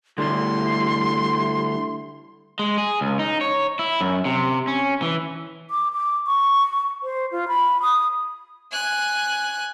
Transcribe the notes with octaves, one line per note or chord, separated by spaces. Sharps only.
D3 G3 A3 E4 C6
G#3
G#4
C#2
D#4
C#5
E4
F#2
C3
C#4
E3
D6
D6
C#6
C5
F4
B5
D#6
G#5 F#6